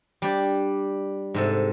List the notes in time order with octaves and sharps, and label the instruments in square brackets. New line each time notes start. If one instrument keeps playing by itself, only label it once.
[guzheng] G3 D4 G4
G#2 C3 A4